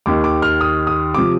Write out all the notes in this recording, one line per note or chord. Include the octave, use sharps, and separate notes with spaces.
D#2 D#3 D6
D6
F6
D#6
D#6
C3 F3 D6